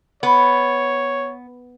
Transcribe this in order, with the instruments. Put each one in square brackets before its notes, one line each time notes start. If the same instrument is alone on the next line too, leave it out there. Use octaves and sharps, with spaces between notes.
[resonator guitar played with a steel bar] B3 [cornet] C#5